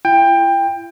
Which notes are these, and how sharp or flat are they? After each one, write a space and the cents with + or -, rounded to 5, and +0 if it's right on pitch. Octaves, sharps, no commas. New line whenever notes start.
E4 +40 G5 +20